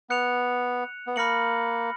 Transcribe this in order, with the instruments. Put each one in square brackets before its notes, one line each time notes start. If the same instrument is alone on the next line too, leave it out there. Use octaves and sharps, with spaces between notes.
[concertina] B3 [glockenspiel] F#6 C#7 F7
[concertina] B3
[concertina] A#3 [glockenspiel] B5 F6 A#6 C#7 F#7